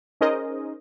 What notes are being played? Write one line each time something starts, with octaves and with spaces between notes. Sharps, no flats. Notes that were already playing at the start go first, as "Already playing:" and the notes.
C#4 D#4 G#4 A#4 C5 D#5